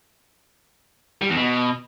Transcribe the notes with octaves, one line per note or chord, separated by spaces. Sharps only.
G3
E2
B2